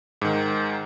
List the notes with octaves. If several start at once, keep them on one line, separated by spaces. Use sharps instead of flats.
G#2 D#3